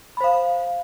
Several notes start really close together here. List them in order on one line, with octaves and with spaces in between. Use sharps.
B5 C5 F5